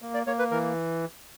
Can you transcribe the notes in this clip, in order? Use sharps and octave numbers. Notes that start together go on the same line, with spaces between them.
A#3
D5
A#3 C#5
B4
E3 A#4